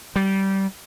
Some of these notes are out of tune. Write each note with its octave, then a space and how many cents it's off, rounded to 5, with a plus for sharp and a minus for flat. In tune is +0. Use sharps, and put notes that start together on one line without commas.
G3 -20